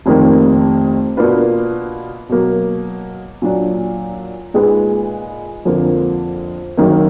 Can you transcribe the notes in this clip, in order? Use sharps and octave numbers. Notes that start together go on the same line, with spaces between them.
F1 F2 D#3 A#3
B2 A#3 D4 F4 B4
B2 F#3 A#3
A#2 F#3 D4
A#2 G#3 D#4 G#4 B4
F2 D3 F3 A#3
F#1 F#2 D#3 A#3